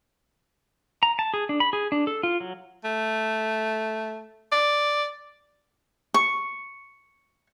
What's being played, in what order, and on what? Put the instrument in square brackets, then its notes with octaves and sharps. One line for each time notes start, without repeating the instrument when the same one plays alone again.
[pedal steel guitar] A#5
A5
G#4
D4
B5
G#4
D4
A4
F4
F#3
[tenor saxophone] A3
D5
[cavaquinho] C#6